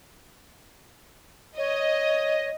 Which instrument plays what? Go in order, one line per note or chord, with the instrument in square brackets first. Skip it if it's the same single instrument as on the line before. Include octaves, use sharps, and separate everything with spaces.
[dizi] C#5 [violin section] D#5